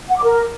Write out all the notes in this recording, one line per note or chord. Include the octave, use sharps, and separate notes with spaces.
F#5
D6
A#4